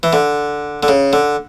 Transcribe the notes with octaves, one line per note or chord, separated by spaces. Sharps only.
E3
D3
D3
C#3
D3